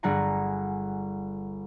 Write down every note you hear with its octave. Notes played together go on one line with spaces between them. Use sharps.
G1 G3 G#4 F#5 G#5 A#5